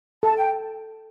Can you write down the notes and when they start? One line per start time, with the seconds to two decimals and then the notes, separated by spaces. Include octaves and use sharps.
0.23 A4 A5
0.36 G5